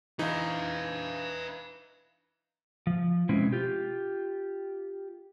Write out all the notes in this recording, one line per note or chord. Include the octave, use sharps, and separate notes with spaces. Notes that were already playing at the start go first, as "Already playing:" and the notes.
E3 D#4 B4 F5
F3
B2 G#3 C4 C#4 E4
F4 G4